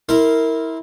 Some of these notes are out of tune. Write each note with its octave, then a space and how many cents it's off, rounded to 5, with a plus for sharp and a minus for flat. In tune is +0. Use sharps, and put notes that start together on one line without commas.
E4 -20 A#4 -15 C6 +0